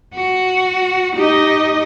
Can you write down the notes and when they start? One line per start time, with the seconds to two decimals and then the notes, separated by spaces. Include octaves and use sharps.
0.15 F#4
1.16 D#4 G4 D#5